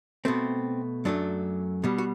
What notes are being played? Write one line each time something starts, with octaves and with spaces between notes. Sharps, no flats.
B2 A3 C4
F#2 F#3 A3 D4
B2 G3
F#4